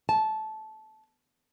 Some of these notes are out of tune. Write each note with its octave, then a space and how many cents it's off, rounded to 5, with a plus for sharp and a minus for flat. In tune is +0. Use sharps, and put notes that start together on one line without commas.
A5 -15